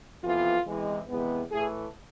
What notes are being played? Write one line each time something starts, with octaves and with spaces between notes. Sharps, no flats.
F2 C3 E3 B3 F4
E2 C3 E3 G#3
E2 C3 G#3 B3
A2 E3 A3 G#4